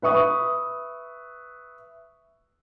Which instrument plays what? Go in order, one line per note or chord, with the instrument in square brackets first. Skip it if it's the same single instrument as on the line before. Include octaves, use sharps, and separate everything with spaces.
[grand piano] B4 E5 C#6 D#6